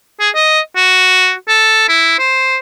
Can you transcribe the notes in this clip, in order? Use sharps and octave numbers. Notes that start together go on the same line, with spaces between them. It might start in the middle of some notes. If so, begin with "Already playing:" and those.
G#4
D#5
F#4
A4
E4
C5